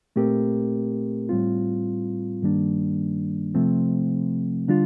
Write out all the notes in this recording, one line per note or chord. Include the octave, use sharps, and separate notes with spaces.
A#2 A3 C4 G4 A#4
A2 G3 C4 F4
G2 D#3 G3 A#3 D4
C3 F3 A3 C4
D3 G3 D4 F4